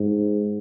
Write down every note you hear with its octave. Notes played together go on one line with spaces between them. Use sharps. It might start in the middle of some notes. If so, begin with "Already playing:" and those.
Already playing: G#2